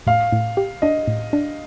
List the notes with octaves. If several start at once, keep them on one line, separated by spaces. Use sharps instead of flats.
A2 F5
A2
G4
D4 D#5
A2
D4